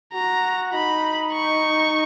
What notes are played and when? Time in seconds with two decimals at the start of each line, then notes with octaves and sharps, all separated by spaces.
0.14 F#4 A#5
0.73 D#4 B5
1.33 C#6